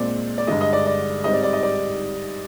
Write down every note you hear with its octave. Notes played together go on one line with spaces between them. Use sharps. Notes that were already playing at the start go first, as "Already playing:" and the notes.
Already playing: A#2 G#3 C4 D5
D5
G2 D3 G#3 D#5
D#5
D5
D5
G#2 G3 C4 D#5
D5
D5
D#5
D5